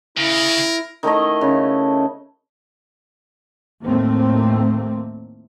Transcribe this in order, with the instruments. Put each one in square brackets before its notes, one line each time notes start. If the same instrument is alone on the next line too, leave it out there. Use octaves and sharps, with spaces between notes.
[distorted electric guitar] C#3 [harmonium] E4 [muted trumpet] A#4
[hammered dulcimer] D#3 A3 E4 D#5
C#3
[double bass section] D#2 A2 A3 A#3 C4